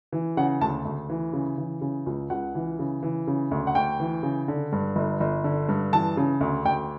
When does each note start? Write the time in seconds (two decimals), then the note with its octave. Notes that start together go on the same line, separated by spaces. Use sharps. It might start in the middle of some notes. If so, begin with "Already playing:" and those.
0.13 E3
0.37 C#3 F#5
0.61 D2 A5
0.85 D2
1.10 E3
1.33 C#3
1.58 E3
1.81 C#3
2.06 C#2
2.30 C#2 F#5
2.55 E3
2.79 C#3
3.03 E3
3.27 C#3
3.51 D2
3.67 F#5
3.75 D2 G5
4.00 E3
4.23 C#3
4.48 D3
4.72 G2
4.96 G1
5.20 G1
5.44 D3
5.69 G2
5.93 E3 A5
6.17 C#3
6.41 D2
6.65 D2 G5